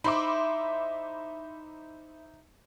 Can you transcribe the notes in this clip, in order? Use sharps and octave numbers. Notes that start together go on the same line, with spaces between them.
D#4 E4 C5 E5 B5 C6 D6